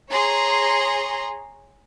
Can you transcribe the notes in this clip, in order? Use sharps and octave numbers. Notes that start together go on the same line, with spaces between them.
G#4 C#5 A#5 C6